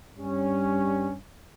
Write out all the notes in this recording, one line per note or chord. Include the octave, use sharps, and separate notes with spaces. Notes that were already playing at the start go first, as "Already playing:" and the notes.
G2 G3 C#4